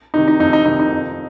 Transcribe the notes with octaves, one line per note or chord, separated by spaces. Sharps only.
C3 D#3 D#4
D#4
F2 D#4
D#4
C3 D#3 D#4
D#4
F2